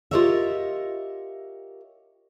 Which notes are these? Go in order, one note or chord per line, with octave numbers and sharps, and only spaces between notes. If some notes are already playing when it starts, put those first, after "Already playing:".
F4 G4 A#4 C#5 D#5 E5